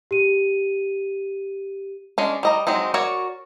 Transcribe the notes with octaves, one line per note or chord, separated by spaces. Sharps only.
G4 D#7
G#3 C#4 D4
G3 D#5 A#5
F#3 G#3 C4 D#4
F#4 A#4 C#5 D5